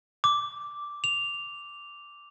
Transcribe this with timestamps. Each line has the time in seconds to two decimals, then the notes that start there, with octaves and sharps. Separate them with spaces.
0.24 D6
1.04 F7